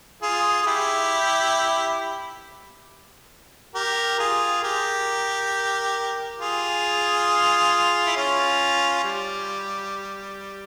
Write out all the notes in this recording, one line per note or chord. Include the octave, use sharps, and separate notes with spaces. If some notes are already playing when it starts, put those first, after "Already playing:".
F4 G#4
G#4
E4 G4
G4 A#4
F4 G#4
G4 A#4
F4 G#4
E4
C#4 F4
G3